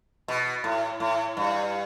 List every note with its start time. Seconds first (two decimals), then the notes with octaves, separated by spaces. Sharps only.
0.28 B2
0.64 A2
1.00 A2
1.37 G2